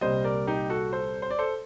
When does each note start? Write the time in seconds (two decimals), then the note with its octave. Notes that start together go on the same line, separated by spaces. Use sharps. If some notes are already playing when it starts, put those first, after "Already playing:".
0.01 C2 A#2 G3 C5 D#5
0.24 A#4 D5
0.47 D#4 G4
0.70 F#4 A4
0.93 A4 C5
1.22 C5
1.31 D5
1.39 A4 C5